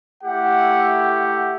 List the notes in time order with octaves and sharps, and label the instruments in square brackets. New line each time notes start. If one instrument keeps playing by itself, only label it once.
[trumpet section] A3 E4 G4 F#5
F#5